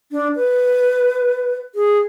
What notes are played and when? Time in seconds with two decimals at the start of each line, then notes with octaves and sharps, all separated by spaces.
0.12 D4
0.36 B4
1.75 G#4